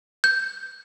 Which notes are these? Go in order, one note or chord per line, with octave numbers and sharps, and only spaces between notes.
G6